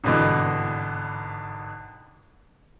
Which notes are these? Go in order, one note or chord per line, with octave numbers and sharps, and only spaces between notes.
G#1 G2 B2 D3 E3